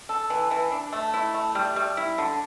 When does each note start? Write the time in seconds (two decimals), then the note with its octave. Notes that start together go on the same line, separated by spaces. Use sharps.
0.09 A4
0.30 E3
0.51 E3
0.72 D4
0.93 A3
1.14 E4
1.34 A3
1.55 G3
1.76 G3
1.97 E4
2.18 D3